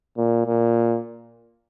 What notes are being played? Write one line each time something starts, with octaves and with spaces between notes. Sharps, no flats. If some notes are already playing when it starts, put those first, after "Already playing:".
A#2
A#2